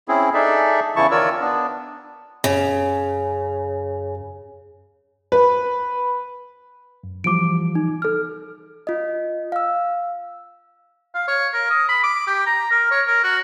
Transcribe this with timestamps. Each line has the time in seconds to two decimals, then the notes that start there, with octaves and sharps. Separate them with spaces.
0.08 C4 C#4 E4 G#4
0.34 D4 D#4 G#4 A4 D5 E5
0.96 E2 C#3 E3 E4 A5 C#6
1.11 D#3 F4 A#4 C#5 D5 E6
1.41 B3 D4
2.44 F#2 C#3
5.32 B4
7.03 F#2
7.24 E3 F3 G3 D6 D7
7.75 D#4
8.02 A4 F6
8.87 F4 D#5
9.52 F5 E6
11.14 F5
11.28 C#5
11.53 A#4
11.70 D#6
11.89 B5
12.03 D6
12.27 G4
12.46 A#5
12.71 A#4
12.91 C#5
13.07 A#4
13.24 F#4